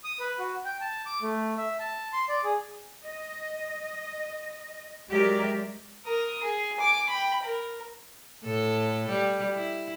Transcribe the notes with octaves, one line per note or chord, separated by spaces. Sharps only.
D#6
B4
F#4
G5
A5
D6
A3
E5
A5
C6
D5
G#4
D#5
F#3 G#3 G4 A#4 D5 E5
A#4 D#6
G#4
G#5 D6
G5 B5
A#4
A2 A4
G3
E4